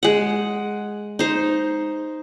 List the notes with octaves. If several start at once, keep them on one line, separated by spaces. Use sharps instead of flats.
G#3 F#5
D#4 C5